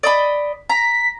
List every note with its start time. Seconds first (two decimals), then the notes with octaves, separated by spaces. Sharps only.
0.03 D5 D#5 B5
0.69 A#5 B6